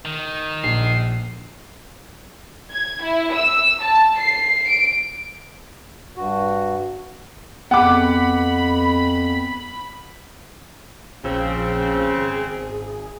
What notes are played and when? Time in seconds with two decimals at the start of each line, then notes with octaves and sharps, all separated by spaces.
0.05 D#3
0.63 A#1 C7
2.72 G#6
3.02 E4
3.34 E6
3.81 A5
4.19 C7
4.69 D7
6.17 G2 F#4
7.71 F2 B3 F#5 B5 D6
11.24 A#1 C#3 F3 C4 E6
12.14 G#1 G#4